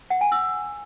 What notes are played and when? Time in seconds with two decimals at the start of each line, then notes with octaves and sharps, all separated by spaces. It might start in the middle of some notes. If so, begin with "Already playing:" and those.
0.10 F#5
0.21 G#5
0.32 E6